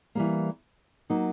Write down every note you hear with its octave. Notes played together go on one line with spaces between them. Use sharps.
E3 G3 A#3
F#3 A#3 D#4